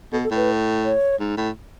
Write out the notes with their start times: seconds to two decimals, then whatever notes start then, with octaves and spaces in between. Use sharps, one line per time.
0.12 B2 A4
0.24 A4
0.31 A2
0.36 B4
0.84 C#5
1.20 G#2
1.37 A2